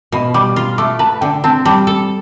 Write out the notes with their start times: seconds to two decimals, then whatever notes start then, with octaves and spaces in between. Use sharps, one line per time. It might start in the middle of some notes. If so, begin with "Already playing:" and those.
0.12 B2 B5
0.34 G3 D6
0.56 F4
0.78 A3 D6
0.99 B4 A5
1.21 D3 G5
1.44 C4 A5
1.65 G3 A5
1.87 A4